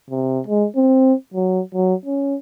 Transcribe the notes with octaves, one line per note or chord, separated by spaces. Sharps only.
C3
G#3
C4
F#3
F#3
C#4